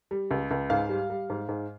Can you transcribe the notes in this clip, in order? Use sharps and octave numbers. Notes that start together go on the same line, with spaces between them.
G3
C#2
C#2
G#2 F5
G3
G3
G#2
G#2